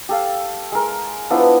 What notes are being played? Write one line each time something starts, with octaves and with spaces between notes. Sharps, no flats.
G4 A4 F5
G#3 A#4
F3 B3 D4 E4